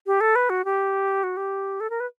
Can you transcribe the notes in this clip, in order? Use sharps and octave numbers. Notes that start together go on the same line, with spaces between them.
G4
A4
B4
F#4
G4
F#4
G4
A4
A#4
B4